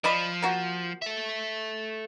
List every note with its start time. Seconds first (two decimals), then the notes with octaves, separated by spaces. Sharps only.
0.04 F3 D5 D#5 B5
0.42 A#3 F#4
1.02 A4 E5